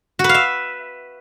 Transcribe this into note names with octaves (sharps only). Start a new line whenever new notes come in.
F#4
B4
F5
E5